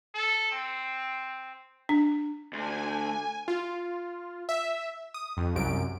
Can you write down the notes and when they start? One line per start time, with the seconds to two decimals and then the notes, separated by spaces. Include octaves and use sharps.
0.15 A4
0.52 C4
1.89 D4
2.53 D2 G#5
3.48 F4
4.49 E5
5.14 D#6
5.37 F2
5.55 C2 F#2 D7